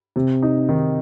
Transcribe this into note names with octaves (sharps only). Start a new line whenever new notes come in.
C3
D#4
D#3